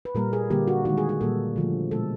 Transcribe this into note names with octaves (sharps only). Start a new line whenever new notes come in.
B4
A#2 G3 A#3 A#4
G#4
D3 G3 A#3 G4
F#4
D#3 G#3 F#4
G#4
G#4
A#2 G3 A#3 A4
D3 F3 A3
B2 G#3 A4